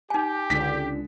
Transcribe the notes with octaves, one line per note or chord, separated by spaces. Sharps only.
D#4 G4 G#5
C#2 D3 B6